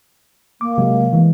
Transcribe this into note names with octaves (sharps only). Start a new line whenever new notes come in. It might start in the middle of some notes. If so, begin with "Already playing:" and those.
A#3 D6
C3 F#3 G#3
E3 G#3